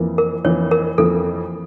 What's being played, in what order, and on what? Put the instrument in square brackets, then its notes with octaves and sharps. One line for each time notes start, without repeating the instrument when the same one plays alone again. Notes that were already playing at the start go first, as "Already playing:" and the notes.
Already playing: [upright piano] F2 E3 A#3
[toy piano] A#4
[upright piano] F2 E3 A#3 [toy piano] C#5
[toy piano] A#4
[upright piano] F2 E3 A#3 [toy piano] A4